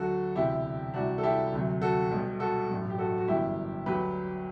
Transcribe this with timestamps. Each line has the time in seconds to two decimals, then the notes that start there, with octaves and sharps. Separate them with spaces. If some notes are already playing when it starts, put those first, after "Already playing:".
Already playing: D2 D3 F#3 F#4 A4
0.36 E1 D2 C3 E3 E4 G4
0.94 C2 C3 E3 G3 D4 F#4
1.18 A4
1.23 E4 G4
1.52 D2 C3 F#3
1.81 F#4 A4
2.11 B1 B2 G3
2.40 F#4 A4
2.69 A1 G2 F#3
2.90 G4
2.98 F#4 A4
3.18 F#4
3.28 G1 F#2 E3 G3 E4 G4
3.86 D2 D3 F#3 G4 B4